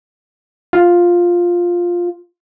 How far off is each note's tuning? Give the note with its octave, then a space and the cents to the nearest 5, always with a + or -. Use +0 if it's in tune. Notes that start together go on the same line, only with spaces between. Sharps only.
F4 +5